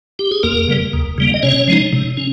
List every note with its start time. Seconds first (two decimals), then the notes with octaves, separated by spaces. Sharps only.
0.19 G4
0.32 G#4
0.43 F2 A#3 A#4
0.68 C#3 G3
0.93 D#2
1.18 C#3 G3 A#3
1.34 D#5
1.43 C3 C#4 C#5
1.68 F3 G#3 D#4
1.93 C3
2.17 C#4